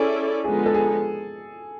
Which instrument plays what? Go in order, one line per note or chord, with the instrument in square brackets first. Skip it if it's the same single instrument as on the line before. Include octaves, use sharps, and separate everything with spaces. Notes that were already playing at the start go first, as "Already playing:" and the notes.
Already playing: [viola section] C#4 E4 A4 D5 [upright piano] G#4
[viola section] D3 F3 G#3 B3 D#4 [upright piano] G#4
[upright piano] A4
G#4